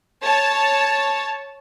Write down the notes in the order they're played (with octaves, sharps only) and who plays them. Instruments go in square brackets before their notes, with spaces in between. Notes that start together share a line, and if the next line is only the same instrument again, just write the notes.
[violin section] C#5 A5